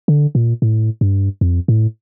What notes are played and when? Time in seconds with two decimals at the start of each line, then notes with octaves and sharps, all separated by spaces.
0.08 D3
0.35 A#2
0.62 A2
1.01 G2
1.41 F2
1.68 A2